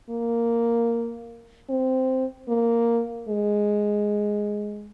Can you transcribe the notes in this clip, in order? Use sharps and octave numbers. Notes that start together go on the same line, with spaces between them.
A#3
C4
A#3
G#3